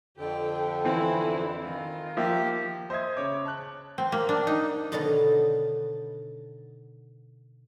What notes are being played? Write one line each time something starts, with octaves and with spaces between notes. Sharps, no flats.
F2 D3 G4 G5
E3 C4 E4
D#3 F4
F3 A#3 G4 E5
C5 D#5 E5 D#6 G#6
C#3 C#5 D6
A5 F#6
C4
A#3
D4
D#4
B2 D3 D#3 F#3 A4 B4